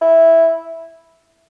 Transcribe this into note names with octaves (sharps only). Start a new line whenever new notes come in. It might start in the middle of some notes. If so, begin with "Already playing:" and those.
E4